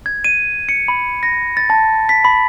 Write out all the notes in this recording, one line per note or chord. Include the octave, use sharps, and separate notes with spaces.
G#6
D#7
C#7
B5
A#6
A6
A5
B6
B5